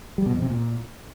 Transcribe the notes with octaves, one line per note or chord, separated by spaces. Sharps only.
G3
B2
F2
C3
A#2